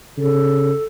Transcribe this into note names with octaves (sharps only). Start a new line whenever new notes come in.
C#3 A4